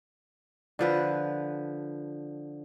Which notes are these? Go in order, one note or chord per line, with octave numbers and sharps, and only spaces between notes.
D3 F3 B4